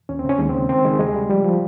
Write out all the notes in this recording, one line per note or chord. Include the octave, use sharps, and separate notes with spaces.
D#2 C#4
C#3 C4
C#4
D#2 G#3
C#3 C4
D#3 C4
D#3 G#3
D#2 G#3
C#3 G3
F3 G3
F3